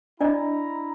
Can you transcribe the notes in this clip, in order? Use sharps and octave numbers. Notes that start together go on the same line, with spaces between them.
D4 E4 D5 D#5 A#5